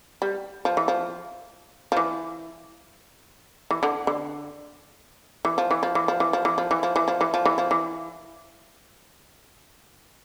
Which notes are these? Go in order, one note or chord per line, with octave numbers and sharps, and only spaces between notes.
G3
F3
E3
F3
F3
E3
E3
D3
D3
E3
F3
E3
F3
E3
F3
E3
F3
E3
F3
E3
F3
E3
F3
E3
F3
E3
F3
E3